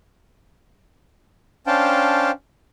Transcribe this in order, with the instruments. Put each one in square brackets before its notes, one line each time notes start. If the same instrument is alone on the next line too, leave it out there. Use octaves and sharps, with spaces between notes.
[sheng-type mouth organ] C#4 D4 C5 F5 G5 A5